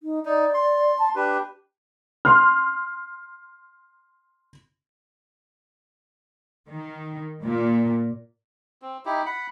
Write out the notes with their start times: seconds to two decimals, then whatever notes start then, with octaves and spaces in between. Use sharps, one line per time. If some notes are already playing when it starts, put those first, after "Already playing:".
0.03 D#4
0.25 D#4 D5
0.54 C6
0.98 A5
1.15 D4 G4 B4
2.25 C6 F6
6.69 D#3
7.42 A#2
8.82 C4
9.05 D#4 E4 G4
9.26 F#5 B5